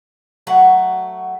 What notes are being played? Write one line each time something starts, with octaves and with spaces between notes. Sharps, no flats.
F#3 A3 F#4 F#5